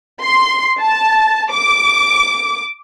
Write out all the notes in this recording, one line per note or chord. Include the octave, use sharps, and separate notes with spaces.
C6
A5
D6